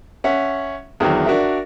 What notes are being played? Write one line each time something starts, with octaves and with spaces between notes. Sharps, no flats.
C#4 E5 F#5
E2 D3 D#3 F#3
D4 F#4 A#4 E5